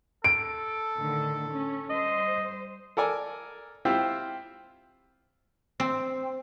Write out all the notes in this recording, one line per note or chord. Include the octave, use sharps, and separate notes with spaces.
A4 D7
A2 D3 D#3
C#4
G3 C5 D#5
A4 A#4 D5 G#5
C4 E4 F4 G4
C4